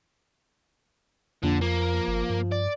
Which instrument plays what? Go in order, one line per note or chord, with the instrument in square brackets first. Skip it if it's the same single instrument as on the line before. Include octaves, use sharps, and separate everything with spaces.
[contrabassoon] A#1 [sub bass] F2 [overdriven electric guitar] D3
[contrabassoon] F3 [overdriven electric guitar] A#3
[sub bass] G1
G2
[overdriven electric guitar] D5